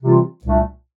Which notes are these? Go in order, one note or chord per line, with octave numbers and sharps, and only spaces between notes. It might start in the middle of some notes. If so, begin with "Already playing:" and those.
C3 E3 G3 C4 F4
C2 A#2 A3 D4